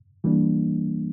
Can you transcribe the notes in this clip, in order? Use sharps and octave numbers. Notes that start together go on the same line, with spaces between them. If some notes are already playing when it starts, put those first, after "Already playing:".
E3 G3 A#3 D4